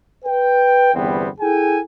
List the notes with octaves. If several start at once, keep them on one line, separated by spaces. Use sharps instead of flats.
B4 G5
G1 E2 G3 B3 C4
E4 G#4 A4 G5 G#5